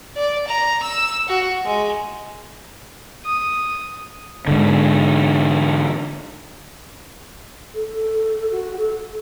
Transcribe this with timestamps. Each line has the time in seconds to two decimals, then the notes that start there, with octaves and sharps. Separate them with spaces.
0.16 D5
0.47 A#5
0.82 E6
1.28 F#4
1.65 G#3
3.26 D#6
4.47 G#2 D3
7.74 A4
8.51 F#4
8.77 A4